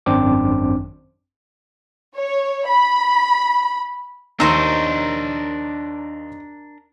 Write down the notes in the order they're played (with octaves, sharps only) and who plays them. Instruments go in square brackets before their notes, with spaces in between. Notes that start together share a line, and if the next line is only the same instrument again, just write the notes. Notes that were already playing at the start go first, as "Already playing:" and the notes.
[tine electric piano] G#1 F#2 C4 D4 C5 D6
[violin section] C#5
B5
[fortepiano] D#2 E6 [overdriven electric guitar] D4 A#4 [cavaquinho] D#4 C5 C#5